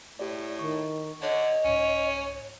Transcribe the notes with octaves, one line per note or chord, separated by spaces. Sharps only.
A2 G4 D5
D#3 C#6
D3 C#5 D#5
C2 G#2 C#4